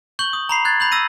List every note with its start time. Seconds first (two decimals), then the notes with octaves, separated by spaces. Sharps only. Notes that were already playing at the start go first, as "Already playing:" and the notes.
0.19 C#6 G6 F#7 G7
0.33 D#6
0.49 A#5 B5 C7
0.65 F#6 G#6 A6
0.80 B5 G6 F#7
0.92 E6 A#6 D#7